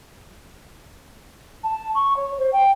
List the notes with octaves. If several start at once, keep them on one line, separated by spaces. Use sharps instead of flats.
A5
C#6
C#5
C5
G5